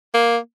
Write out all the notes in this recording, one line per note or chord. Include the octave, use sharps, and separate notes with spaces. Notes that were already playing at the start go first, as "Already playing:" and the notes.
A#3